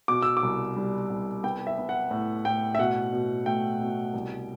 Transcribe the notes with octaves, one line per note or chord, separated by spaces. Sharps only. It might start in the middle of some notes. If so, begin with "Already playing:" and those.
B2 D6
E6
D6
C2
G3
C2
B3 G5
E5
B3
F#5
A2
A2 G5
E5
B2 F#5
B2
A3 G5
B2
C2